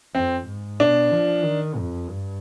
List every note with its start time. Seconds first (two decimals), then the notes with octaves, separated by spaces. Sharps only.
0.15 F2 C4
0.47 G#2
0.80 B2 D4
1.12 F3
1.44 D#3
1.77 F2
2.09 G2